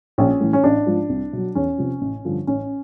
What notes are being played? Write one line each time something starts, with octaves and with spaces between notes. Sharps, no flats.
A#1 C#4
A2 E3
C#4
A1 D4
G#2 F3
C2
B2 F#3
E2 C#4
C3 F3
A1
G2 D3 F3
A1 C#4